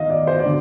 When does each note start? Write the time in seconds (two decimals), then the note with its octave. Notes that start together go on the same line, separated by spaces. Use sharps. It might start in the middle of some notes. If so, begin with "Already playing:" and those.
Already playing: D#3 D#5 F5
0.10 D5
0.27 C5
0.39 D5
0.45 D3